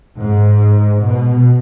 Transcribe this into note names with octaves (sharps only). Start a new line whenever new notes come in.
G#2
B2